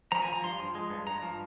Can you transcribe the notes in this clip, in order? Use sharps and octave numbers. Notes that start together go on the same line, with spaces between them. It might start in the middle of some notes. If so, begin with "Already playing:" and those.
F3 A#5
G#5
F3 A#5
G2 C6
F3
G#3
G2
G2 A#5
F3